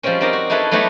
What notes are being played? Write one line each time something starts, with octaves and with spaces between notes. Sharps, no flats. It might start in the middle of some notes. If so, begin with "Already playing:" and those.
F3 G3 G#3 C4 C#4
C4 D#4 G4 A#4
F#4
D#4 E4 G#4 A4 B4
F#3 A3 B3 D#4 G4 B4